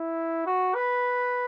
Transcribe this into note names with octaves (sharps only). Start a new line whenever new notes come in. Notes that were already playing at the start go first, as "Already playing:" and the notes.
Already playing: E4
F#4
B4